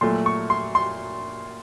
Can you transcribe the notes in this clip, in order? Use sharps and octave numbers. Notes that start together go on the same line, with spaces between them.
A#2 F#3 A3 C6
C#6
C6
C6